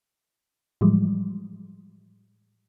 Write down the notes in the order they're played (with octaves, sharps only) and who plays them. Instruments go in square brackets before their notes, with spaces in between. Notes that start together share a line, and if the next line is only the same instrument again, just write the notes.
[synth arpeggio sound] A2 E3 F3 G3 G#3